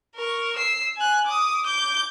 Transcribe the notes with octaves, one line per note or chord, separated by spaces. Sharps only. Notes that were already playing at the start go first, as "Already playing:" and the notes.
A#4 C#6
E6 C7
G#5 F#6
D6 D#6
D6 G6